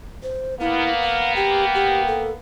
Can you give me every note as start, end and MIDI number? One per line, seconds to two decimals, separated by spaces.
0.23 0.55 72
0.60 2.39 58
0.60 2.39 59
0.60 0.93 64
0.60 1.33 77
1.01 1.33 78
1.36 1.65 67
1.36 2.27 79
1.75 2.02 67
2.07 2.31 69